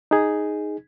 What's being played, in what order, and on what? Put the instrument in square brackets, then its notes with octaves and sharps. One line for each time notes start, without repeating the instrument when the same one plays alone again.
[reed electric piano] D#4 G#4